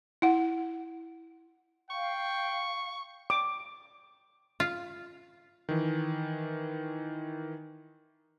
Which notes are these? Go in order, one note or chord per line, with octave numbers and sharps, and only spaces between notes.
E4 F#5
F5 G5 C#6
D6
F4
D#3 E3